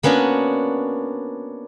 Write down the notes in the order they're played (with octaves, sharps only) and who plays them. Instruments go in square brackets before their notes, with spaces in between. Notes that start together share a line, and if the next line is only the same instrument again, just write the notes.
[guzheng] A#3 B3 C#4 D4 F#4